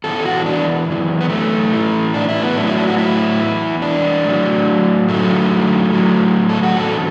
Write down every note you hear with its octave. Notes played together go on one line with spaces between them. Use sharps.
E2 E3 A4
F#4
D4
F#2 E3
B3
A3
A2 E3
D4
E4
B3
A2 F#3 D4
E4
D4
F#4
E4
E2 E3
D4
A2 F#3
F#2 D3 F#3 A3
A2 F#3
A4
F#4
E2 D3 F#3 A4